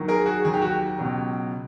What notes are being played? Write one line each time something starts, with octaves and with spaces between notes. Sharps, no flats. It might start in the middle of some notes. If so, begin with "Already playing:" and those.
Already playing: D#2 D#3 F#3
G#4 A#4
F#4 G#4
D#2 D#3 F#3 G#4
G4
F#4
G4
C#2 B2 F#3